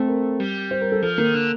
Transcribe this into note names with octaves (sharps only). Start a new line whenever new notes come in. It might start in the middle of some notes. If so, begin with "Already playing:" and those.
Already playing: A3 C4
A#4
G3
C5
A#4
A4
F3 A4
D#3 A#3
D3